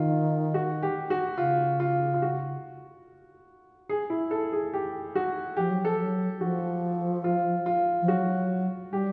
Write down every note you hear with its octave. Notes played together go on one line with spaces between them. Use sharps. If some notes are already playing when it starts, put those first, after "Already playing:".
Already playing: D#3 F4
F#4
G4
F#4
C#3 F4
F4
F4
F#4
G#4
E4
A4
G#4
G4
F#4
F3 G4
F#3
F3 A4
F#3
F3 F#4
F4
F4
F3
F#3 F#4
G3 G4